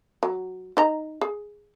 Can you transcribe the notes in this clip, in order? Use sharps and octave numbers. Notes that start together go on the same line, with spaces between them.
F#3
D#4 D#5 A#5
G#4